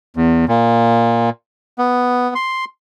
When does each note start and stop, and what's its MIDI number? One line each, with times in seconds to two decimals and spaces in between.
0.16 0.45 40
0.48 1.30 46
1.78 2.34 59
2.35 2.65 84